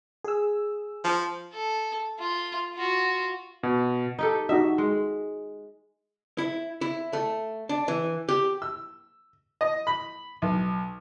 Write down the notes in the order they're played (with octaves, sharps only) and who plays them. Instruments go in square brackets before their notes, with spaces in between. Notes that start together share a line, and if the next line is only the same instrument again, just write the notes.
[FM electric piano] G#4 E6
[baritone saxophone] F3
[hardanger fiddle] A4
F4
F4 F#4
[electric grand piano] B2
[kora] D#4 G4 A4
[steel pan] D#4 F#4 D#5 [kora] E5
[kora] G#3
[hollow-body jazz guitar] E4
E4
A3
D4
E3
G4
[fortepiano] E6
D#5
B5
B1